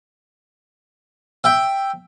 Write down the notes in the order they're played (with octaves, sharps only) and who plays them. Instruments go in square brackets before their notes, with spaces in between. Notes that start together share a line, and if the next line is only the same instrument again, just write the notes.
[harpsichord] E5 G5